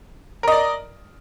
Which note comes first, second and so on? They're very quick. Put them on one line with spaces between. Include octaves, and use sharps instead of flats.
A#4 D#5 D5